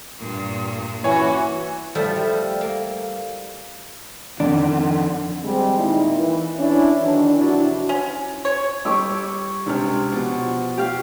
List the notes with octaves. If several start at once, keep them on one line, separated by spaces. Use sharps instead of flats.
G2 A#2
E3 C#4 F#4 C#5 G#5
F3 G3 A3 E4 F4
G3
A#3
F2 D3 D#3 D4
G3 G#3 C4
A#2 D#3 A#3 D#4 E4
E3
C#4 D4 E4
D#3 E3 F#3 D4
C3 F3 D4 E4 F#4
C#4
C#5
G3 C#5 D6 E6
C#2 C3 D4 G4 F6
B2 F3 F#4
G4 F5